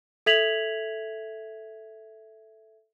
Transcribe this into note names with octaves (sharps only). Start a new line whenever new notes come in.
A4 E5 G#6 B6 F7 F#7